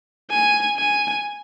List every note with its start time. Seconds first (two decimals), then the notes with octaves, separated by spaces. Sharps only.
0.30 G#5
0.77 G#5